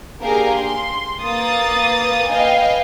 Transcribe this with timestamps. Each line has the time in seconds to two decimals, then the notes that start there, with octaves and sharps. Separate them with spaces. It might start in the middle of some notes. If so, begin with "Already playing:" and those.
0.20 A#3 D4 G4 G#4 A#4 F5
0.53 C6
1.23 A#3 B4 D#6 A6
2.29 B4 D#5 F5 G5 G#5